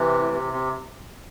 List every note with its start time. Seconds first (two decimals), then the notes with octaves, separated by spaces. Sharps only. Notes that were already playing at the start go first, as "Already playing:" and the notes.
Already playing: C3 E3
0.20 A2
0.33 C3
0.53 C3